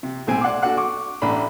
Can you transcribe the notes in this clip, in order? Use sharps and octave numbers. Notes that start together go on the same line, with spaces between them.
C3
B1 A2 C4 G#5
D5 F#5 C6 D6
D4 F#4 A4 F#5 F#6
C#6 D6
A1 D4 B5